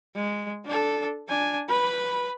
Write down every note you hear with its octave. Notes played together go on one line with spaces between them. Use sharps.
G#3
D4 A4
D4 G#5
B4 B5